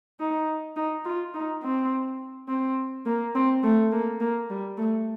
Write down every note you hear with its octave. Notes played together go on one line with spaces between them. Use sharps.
D#4
D#4
F4
D#4
C4
C4
A#3
C4
A3
A#3
A#3
G3
A3